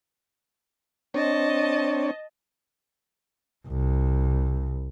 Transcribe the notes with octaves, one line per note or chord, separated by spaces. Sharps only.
C4 D4 C#5 D#5 A5
C2